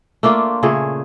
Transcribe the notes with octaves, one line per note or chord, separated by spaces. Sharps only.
A3 A#3 D4 F4
A#2 C#3 A3 G#4